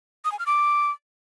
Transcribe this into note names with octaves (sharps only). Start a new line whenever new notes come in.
D#6
G#5
F6
D6